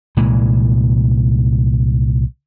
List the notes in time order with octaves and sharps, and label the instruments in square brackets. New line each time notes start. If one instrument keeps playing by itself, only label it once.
[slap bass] C2 A#2 E3 G#3